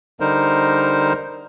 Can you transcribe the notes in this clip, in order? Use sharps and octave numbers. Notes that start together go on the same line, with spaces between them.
D3 G3 D#4 A#4 C5